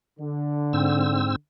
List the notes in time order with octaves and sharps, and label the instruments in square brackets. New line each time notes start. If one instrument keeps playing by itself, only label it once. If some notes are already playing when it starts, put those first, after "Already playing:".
[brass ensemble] D3
[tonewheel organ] G#2 C4 E6